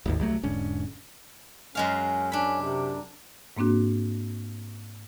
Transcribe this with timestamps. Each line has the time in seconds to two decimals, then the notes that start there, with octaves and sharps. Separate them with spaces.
0.06 D#1 G#1 D#2
0.19 C2 F#3 A3
0.43 E1 G#2 D3 C#4
1.75 F#2 G#3 C#4 F5
2.32 C#4 D4 B5
2.61 C3
3.57 G#2 A#3 C4 D4 F#4